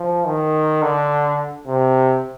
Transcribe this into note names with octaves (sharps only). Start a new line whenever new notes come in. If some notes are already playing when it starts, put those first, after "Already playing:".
Already playing: F3
D#3
D3
C3